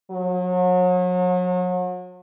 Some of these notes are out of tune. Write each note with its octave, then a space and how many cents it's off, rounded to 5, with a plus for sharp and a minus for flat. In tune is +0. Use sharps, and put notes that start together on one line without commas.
F#3 -35